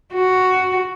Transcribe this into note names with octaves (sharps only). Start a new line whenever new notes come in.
F#4